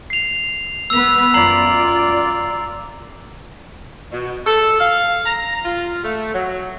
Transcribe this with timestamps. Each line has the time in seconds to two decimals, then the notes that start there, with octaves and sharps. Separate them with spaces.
0.10 C7 F7
0.90 B3 B4 E6 F7
1.34 F#2 F4 D5 A#5 C7 F#7
4.11 B2
4.46 A4
4.80 F5
5.25 A#5
5.64 F4
6.03 A3
6.34 F#3